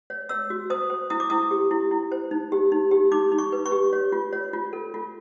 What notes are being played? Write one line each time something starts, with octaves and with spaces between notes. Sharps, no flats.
C#5
C#5 E6
F#4
C5 D#6
C5
E4 D#6
D6
E4 D#6
G4
E4
E4
C5
D#4
G4
D#4
G4
D#4 D6
D#4
C#6
B4
C#6
G4
C#5
F4
C#5
F4
A4
F4